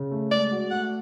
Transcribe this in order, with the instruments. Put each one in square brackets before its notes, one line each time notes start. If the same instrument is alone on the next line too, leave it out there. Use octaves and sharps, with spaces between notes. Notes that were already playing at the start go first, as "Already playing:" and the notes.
Already playing: [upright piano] C#3
A3
[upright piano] G#3 [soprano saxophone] D5
[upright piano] F#4
[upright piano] A3 [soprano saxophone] F#5